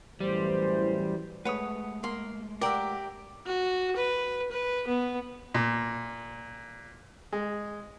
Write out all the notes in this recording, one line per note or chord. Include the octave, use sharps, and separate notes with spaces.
F#2 A2 E3 G3 C5
G#3 A3 B4 C#5 F#5 D#6
A#3 C6
G4 A#4 D5 E5 F#5 D6
F#4
B4
B4
B3
A#2
G#3